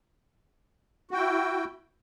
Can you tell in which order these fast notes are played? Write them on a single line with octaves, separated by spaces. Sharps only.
F#4 G5 E4